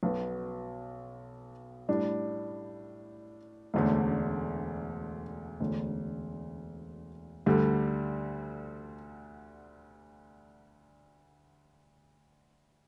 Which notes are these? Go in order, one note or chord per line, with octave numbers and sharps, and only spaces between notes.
B1 B2 B3
A2 G3 D4
E1 D2 D3 A3
E1 D2 D3
D2 D3 G3